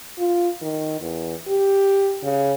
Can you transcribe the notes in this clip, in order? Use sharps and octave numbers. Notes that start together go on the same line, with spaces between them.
F4
D#3
E2
G4
C#3